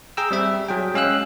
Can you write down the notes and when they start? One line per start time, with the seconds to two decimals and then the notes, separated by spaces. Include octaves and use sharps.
0.17 G#4 G5 A#5 E6
0.31 G3 C4 E5
0.68 F#3 G#4 G5
0.94 G#3 C#4 F5 E6 F#6